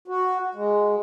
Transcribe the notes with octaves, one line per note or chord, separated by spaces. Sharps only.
F#4
G#3